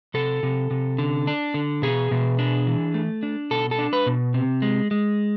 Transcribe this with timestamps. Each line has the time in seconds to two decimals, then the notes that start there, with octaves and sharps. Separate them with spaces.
0.14 C3 A4
0.43 C3
0.71 C3
0.98 D3
1.27 D4
1.54 D3
1.82 B2 G#4
2.11 B2
2.39 D4
2.67 E3
2.94 A3
3.23 D4
3.51 B2 A4
3.71 A4
3.79 D4
3.93 B4
4.06 B2
4.34 C3
4.62 G#3
4.91 G#3